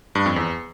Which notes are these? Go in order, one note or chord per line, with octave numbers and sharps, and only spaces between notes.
G2
F2
E2